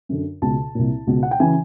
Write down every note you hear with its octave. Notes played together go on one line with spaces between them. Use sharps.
F#2 D3
C#2 B2 A5
C2 A#2
C#2 B2
F#5
G5
C#3 E3 G#5